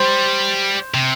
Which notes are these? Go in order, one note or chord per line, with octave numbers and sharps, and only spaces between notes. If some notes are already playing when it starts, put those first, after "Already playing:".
Already playing: G3 C5
C3